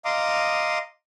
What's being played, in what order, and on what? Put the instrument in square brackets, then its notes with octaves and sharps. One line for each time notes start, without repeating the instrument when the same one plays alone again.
[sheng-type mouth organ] D#5 F5 A#5 C6 D6 D#6